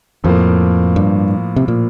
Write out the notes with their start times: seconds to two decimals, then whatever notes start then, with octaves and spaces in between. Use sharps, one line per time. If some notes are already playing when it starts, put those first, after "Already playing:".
0.24 F2 A2 F3 A#3
0.96 G2
1.56 C3
1.68 A#2